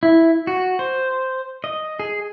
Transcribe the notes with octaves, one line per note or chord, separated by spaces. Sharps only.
E4
F#4
C5
D#5
G#4